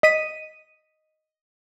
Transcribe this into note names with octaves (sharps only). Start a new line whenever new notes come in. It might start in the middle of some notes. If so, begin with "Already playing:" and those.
D#5 B6 D#7